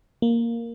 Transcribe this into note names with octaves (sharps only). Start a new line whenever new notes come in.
A#3